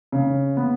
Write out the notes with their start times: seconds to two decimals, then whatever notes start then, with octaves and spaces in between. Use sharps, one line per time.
0.12 C#3
0.57 B3